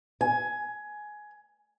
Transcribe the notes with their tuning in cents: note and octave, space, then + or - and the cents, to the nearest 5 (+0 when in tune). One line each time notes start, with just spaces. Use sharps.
G#5 +15